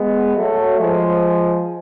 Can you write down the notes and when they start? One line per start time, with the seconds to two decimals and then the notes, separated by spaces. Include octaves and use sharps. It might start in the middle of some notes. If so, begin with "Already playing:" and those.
Already playing: G#3 B3
0.36 F#3 A3
0.80 F3 G#3